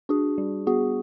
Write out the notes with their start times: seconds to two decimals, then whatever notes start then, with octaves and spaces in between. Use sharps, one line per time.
0.09 D4 F#4 G#4
0.38 G3
0.67 B3 F#4 G#4